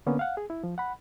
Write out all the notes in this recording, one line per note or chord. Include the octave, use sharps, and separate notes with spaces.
D3 A#3 B3 C#4
F5 F#5
G#4
E4
F3
F#5 B5